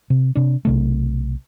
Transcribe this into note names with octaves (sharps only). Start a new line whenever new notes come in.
C3
C3 D4
B1 C3 A3